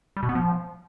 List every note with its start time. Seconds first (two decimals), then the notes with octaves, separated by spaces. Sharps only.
0.17 G3
0.23 B2
0.29 B3
0.35 F3